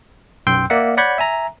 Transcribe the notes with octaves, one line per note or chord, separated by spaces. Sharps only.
B1 F#2 G5 C6 E6 G6
A#3 D5 E5 F#5
C#5 D5 F#5 B5 G6 G#6
E5 G#5 A#5